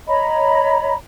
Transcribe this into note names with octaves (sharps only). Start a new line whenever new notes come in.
C#5 D#5 A#5 B5